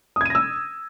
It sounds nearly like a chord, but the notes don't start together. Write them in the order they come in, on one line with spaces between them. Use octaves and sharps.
D#6 G#6 D#7 A#6 E6